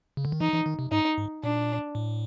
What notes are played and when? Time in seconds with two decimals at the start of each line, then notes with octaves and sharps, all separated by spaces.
0.17 C#3
0.25 D3
0.32 D#3
0.41 E3 D#4
0.53 E3
0.66 D#3
0.79 C3
0.92 G#2 D#4
1.18 G#2
1.44 A#2 D4
1.95 A2